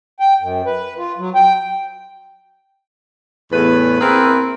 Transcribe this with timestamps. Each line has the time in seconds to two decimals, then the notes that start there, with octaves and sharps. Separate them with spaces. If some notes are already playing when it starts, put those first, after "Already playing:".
0.20 G5
0.41 F#2
0.66 B4
0.98 F4
1.18 F#3
1.35 G5
3.52 E2 A2 B4
4.01 A#3 C4 E4 G#4 A#4 B4